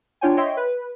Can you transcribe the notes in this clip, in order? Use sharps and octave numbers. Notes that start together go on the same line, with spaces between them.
D4 F4 C#5 G5 G#5
C#5 D#5 E5 G5 C6
B4